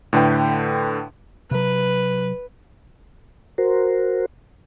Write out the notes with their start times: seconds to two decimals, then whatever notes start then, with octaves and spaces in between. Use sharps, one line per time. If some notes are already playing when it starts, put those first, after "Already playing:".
0.13 A2 D3 B4 G5
1.51 C3 F#3 B4
3.58 F#4 A#4 C5